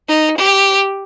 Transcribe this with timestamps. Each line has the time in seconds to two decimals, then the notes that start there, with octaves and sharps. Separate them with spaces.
0.09 D#4
0.37 G4